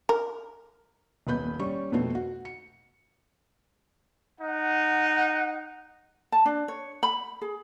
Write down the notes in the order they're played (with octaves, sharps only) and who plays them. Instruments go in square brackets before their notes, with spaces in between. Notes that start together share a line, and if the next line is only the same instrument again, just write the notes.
[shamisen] A#4
[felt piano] D#1 B1 B4 B5 G6
G3 C#4 C#6
F2 B2 A3 B3 C4 C5
F#4
C#7
[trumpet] D#4 [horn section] F#5
[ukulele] A5
D4
C#5
B5
G#4